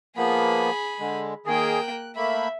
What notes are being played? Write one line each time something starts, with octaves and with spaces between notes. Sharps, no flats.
F3 A#3 B3 G#4 B5
D3 G#3
D#3 A#3 G#4 G5
F#6
A3 A#3 E5 B5